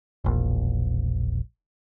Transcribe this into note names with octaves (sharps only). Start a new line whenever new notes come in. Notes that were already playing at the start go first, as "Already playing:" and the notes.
E1 A#1